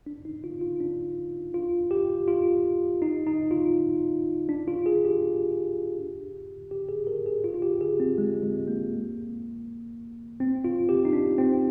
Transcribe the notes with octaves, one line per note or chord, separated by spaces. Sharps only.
D4
D#4
F4
F4
D4
F4
G4
F4
D#4
D#4
F4
D4
F4
G#4
G4
G4
G#4
A#4
G#4
F4
F4
G4
G#4
C4
G#3
G#3
A#3
C4
F4
G4
D#4
D4
C4